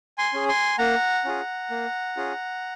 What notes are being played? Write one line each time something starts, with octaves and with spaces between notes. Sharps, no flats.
G#5 C6
C#4 G#4
G#5 C6
A#3 F#5 A#5
C#4 F4 G#4
A#3
C#4 F4 G#4